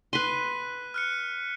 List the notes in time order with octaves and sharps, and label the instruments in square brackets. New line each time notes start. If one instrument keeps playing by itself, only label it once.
[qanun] B4 C6 [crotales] F#6 B6 D#7
[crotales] F6 F#6 C#7